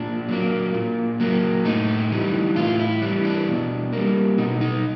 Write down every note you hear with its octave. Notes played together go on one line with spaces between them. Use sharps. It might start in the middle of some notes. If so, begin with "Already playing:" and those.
Already playing: A#2 D4
F#3 A#3
A#2
F#3 A#3
A2 D#4
E3 G3
A2 F4
E4
E3 G3
D4
B2
G3 A#3
B2 D#4
D#4